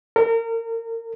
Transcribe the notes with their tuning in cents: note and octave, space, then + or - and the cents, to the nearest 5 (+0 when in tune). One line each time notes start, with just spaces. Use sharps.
A#4 -30